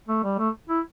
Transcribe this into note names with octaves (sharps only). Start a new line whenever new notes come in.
A3
G3
A3
E4